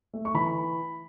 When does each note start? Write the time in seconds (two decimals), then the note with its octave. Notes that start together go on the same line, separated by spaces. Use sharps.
0.13 A3
0.25 C#6
0.34 E3 B5